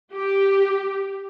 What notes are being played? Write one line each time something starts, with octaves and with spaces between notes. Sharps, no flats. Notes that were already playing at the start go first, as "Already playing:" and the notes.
G4